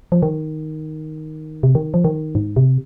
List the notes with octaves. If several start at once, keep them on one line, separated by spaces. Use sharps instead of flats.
F3
D#3
C3
D#3
F3
D#3
G#2
C3